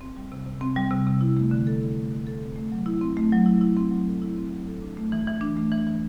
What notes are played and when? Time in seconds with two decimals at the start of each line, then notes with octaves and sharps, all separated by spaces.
0.01 C4
0.17 G3
0.32 C3
0.46 C3
0.61 C4
0.76 G3
0.91 C3
1.07 C3
1.21 E4
1.37 A3
1.51 D3
1.67 A4
1.81 E4
1.97 A3
2.11 D3
2.27 A4
2.42 C4
2.56 A3
2.72 F#3
2.86 E4
3.01 C4
3.17 A3
3.32 F#3
3.46 E4
3.61 E4
3.77 C4
3.91 F#3
4.07 A4
4.22 E4
4.37 C4
4.52 F#3
4.67 A4
4.82 D4
4.97 A3
5.12 E3
5.27 E3
5.41 D4
5.57 A3
5.72 E3
5.87 E3